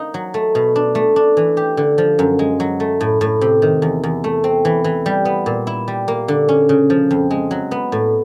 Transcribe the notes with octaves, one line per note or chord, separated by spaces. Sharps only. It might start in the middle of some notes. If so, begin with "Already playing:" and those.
Already playing: A#3 D#4
F#3
A3
B2
D4
A3
D4
E3
G4
D3
F3
F#2
G#3
F#3
A3
A2
A2
C3
D#3
E2
E2
A3
C4
E3
E3
G3
B3
A#2
E4
G3
A#3
D3
C#4
C#3
F3
F2
G#3
F#3
B3
A2